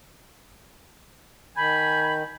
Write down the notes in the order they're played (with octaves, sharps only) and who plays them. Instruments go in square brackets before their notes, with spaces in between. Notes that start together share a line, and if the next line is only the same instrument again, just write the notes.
[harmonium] D#3 [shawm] G#5 [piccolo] B5 [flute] G6